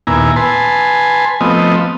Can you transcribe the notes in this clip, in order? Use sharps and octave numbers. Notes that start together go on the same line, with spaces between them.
D#2 A#2 B3 E4 G#5 A#5
B4 G#5 A5 C6
F3 A3 B3 C4 D#5